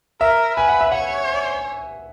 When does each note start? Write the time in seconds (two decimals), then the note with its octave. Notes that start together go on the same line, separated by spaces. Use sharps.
0.21 A#4 E5
0.57 B4 G#5
0.69 F#5
0.81 E5
0.92 C#5 F#5